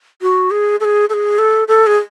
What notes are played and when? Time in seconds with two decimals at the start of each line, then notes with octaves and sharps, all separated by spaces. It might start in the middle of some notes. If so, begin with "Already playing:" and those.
0.22 F#4
0.51 G#4
0.80 A4
0.84 G#4
1.10 A4
1.14 G#4
1.39 A4
1.68 A4
1.87 G#4